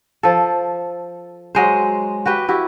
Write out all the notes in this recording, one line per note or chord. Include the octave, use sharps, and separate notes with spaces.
F3 A4
F#3 G#3 C5
F#4 G4 B4 G5
E4 F#4 G4